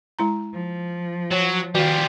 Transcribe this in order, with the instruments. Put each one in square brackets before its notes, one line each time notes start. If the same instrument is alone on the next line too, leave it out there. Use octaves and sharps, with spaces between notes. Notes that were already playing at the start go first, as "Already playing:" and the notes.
[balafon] G#3 E4 A#5
[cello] F3
[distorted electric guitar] F#3 [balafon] C#5
[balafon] D#3 F#4 D5 [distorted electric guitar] G3 F4